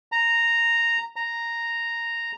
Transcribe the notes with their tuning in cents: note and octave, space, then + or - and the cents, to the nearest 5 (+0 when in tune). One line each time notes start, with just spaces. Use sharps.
A#5 -5
A#5 -5